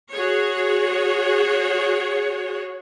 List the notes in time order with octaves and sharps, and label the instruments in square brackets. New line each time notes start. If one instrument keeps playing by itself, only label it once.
[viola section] F#4 G#4 C#5